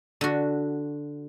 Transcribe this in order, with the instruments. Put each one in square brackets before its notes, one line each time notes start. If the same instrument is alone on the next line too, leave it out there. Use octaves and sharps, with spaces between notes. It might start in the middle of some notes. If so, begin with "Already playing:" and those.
[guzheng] D3 F#4